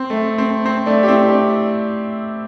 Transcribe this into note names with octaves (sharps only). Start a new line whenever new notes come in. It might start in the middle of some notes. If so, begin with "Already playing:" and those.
Already playing: C4
A3
C4
C4
A3 D4
G4
C4 E4
D4 G4